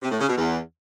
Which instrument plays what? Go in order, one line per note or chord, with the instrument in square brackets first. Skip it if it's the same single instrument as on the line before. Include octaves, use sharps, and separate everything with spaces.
[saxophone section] C3
A2
C#3
B2
E2